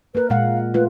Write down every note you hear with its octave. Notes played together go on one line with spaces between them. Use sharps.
A#3 A#4 B4
A#2 G#3 F5 F#5
A3 F4 B4